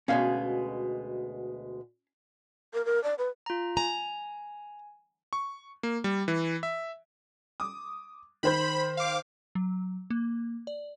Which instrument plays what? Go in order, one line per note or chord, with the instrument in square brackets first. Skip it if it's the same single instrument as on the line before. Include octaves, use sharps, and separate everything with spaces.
[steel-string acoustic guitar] D2 B2 G#3 [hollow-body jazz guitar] C#4 F5
[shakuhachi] A#4
A#4
D5
B4
[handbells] F4 A#5
[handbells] G#5 [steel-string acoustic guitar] A#5
[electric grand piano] C#6
A#3
G3
E3
E5
[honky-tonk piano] D6 D#6
[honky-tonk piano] D#3 C5 G6 [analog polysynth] B5
[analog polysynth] F5 D6
[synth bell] F#3
A#3
D5